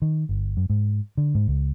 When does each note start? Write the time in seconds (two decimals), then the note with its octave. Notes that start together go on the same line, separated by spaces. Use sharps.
0.02 D#3
0.29 G1
0.57 F#2
0.70 G#2
1.17 D3
1.35 G#2
1.48 C#2